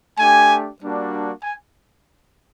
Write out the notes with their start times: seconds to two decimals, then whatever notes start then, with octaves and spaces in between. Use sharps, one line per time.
0.18 A3 D4 G4 G#5
0.81 G3 A#3 D4 F#4
1.43 G#5